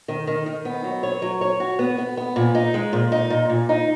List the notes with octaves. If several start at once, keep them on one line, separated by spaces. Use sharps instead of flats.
D#3
D#3
D#3
B3
F#3
C#5
F#3
C#5
F#4
B3
B3
B3
A#2
D#4
G#3
A#2
D#4
A#2
A#2
D#4